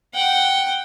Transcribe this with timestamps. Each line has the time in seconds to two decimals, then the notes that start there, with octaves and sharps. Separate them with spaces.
0.14 F#5 G5